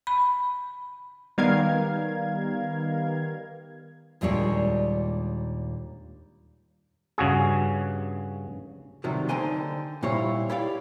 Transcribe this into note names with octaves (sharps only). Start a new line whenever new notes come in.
B5
D#3 G3 B3 A#4 F5 G#6
D#2 A#2 G3 G#3 D4 C#5
G2 C#3 F#4 G#4
C3 D#3 F#3 G3
D3 D#4 C5 G5 G#5 C6
A#2 G3 E4 C5 C#5
E4 G4 C#5 D5 F5